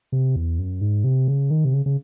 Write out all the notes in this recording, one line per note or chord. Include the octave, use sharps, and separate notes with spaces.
C3
E2
F#2
G#2
C3
C#3
D#3
C3
C#3
C#3